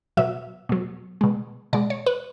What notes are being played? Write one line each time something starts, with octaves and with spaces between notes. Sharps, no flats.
B2 F#3 E5
B2 F#3
B2 G#3
B2 G#3 D5
C#5
B4